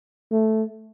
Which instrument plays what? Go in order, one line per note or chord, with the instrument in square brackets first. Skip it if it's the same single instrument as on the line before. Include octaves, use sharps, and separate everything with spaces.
[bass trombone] A3